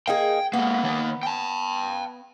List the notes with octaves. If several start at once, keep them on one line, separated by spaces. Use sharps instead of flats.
A#3 D#4 G#4 G5
G#3 A#3 B3
D#3 A#3
G5 A5